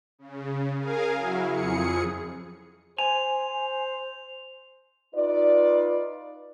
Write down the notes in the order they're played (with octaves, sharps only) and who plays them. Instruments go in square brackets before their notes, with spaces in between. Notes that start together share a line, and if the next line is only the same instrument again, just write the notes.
[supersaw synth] C#3
G#4 A#4 F5 G#5
F#3 E4
F2 G#4 C#7
[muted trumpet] C5 [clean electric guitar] G#5 [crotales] F7
[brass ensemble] D#4 F4 B4 D5